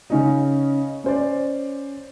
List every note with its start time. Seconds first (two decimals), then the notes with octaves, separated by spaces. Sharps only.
0.10 C#3 C#4 D#4
1.04 C#4 C5 D5